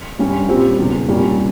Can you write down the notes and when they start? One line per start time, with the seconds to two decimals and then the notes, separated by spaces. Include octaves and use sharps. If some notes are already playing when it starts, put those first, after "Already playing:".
0.19 G2 G3 C#4
0.48 A#2 G3 C4 G4
0.78 E1 E2 C#3
1.08 C2 A#2 G3 A#3 C#4